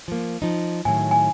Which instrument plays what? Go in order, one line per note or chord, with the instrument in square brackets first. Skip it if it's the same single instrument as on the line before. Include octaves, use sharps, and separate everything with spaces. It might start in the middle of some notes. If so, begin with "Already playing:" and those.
[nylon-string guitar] F3 A#3
F3 D#4
[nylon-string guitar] A2 D#3 F#3 [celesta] G#5
[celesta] G#5